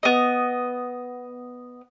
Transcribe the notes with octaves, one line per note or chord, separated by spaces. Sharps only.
B3 D#5